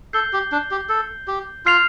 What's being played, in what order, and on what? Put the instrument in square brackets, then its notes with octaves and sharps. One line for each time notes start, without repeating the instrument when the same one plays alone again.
[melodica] A4 [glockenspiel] G6 C7 G7
[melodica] G4
D4
G4
A4
G4
[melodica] F4 [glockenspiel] F6 C7 F7